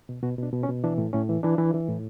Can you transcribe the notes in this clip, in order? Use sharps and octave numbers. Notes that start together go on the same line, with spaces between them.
B2
B2 F#4
B2 D4
B2
C#4
B2
E3 D4
A2
A2 C#4
E3
E3 D4
E3
E3
A2